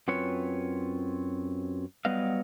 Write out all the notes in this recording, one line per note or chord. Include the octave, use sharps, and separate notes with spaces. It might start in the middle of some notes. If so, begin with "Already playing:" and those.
F#2 C4 F4 B4 C#5
F#3 G3 B3 B4 D#5 F5